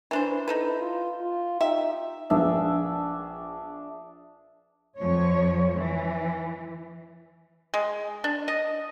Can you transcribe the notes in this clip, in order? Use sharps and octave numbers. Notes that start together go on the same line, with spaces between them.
E3 D4 C5
D#4 E4 A4 B4
F4
F4
D#4 G4 E5
A#1 B3 D4 G#4 E5
F2 F3 C#5
E3
G#3
D4
D#5